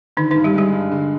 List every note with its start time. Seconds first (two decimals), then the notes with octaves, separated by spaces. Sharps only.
0.17 D3 D#3 D#4
0.31 D#3 D#4
0.36 G2
0.44 G3 G4
0.54 G3 G#3 G4
0.72 G2
0.91 D3